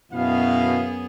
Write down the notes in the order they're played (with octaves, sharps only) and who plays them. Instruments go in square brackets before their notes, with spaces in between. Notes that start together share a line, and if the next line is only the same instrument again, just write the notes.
[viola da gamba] F#2 B3 G#4 [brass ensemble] B2 E4 F5